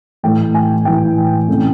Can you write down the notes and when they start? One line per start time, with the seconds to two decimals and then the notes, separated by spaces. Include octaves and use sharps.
0.23 A2 E3 A3 G5
0.54 G#5
0.85 A2 E3 A3 G5
1.48 C3 E3 A3 C#4